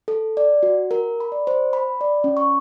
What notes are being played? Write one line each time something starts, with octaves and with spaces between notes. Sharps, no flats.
A4
D5
F#4
A#4
B5
D5
C5
B5
D5
C#4
C#6